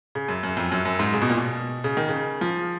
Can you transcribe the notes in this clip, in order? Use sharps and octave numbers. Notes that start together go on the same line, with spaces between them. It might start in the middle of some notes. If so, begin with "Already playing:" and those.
C#3
F#2
F#2
F2
F#2
F#2
G#2
C#3
B2
A#2
B2
C#3
D#3
C#3
F3